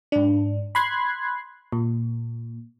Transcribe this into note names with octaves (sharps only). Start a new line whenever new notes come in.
G#2 D4
B5 C6 F#6 G#6 C7
A#2